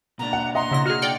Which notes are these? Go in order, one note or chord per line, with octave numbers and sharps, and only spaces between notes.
B2 A#3 D4 A#5
F#5
D#5 F#5 A#5 C6
C#3 E4 A#6
F#4 G#4 F6
D5 G5 C#7